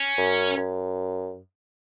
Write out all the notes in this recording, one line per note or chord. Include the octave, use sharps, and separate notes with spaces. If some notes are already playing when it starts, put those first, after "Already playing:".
Already playing: C#4
F#2
F#2